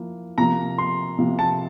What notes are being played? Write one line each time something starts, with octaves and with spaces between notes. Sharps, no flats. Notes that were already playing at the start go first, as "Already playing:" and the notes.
Already playing: F3 A#3 E4
C3 F3 A#3 A#5
C6
C3 F3 A#3
A5